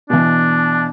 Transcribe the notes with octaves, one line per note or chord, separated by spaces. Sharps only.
B2 E3 D4